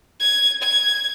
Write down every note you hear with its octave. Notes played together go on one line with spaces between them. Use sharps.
G#6
G#6